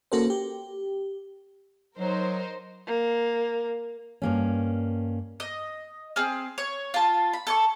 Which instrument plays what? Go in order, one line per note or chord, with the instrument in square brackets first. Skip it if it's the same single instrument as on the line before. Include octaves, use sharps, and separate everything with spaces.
[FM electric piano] A#3 C#4 F#4 A4 A#4 C5
G4
[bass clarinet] F#3 [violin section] D#4 A#4 C5
[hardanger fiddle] A#3
[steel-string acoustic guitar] G2 A#3 C#4
[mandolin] D#5
C4 G#4 F6
C#5
F4 A5
B5
A4 G#5 C#6